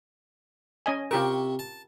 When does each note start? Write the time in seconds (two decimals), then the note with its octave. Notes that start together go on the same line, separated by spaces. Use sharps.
0.86 C#4 D#5 G#5
1.11 C3 F4 G4 A#4 C#6
1.59 A5